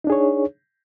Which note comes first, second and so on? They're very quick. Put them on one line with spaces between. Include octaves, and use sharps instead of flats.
D#4 D4 G#4 C#5